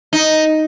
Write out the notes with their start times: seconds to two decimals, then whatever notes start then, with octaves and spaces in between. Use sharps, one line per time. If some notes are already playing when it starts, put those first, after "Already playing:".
0.13 D#4